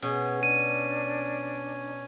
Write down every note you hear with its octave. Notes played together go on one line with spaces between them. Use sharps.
B2 C#4 G#4
D4 D#7